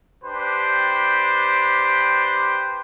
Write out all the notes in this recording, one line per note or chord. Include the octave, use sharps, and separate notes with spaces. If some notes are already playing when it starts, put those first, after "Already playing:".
D4 G4 B4 C5